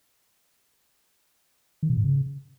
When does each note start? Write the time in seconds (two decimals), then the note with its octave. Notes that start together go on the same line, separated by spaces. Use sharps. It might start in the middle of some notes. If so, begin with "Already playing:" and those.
1.83 D#3
1.90 B2
1.97 G#2
2.04 C#3